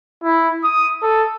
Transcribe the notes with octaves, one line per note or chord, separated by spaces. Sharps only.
E4
D#6
A4